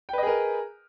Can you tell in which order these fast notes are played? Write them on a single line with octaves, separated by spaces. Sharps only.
G5 B4 D#5 G#4 A#4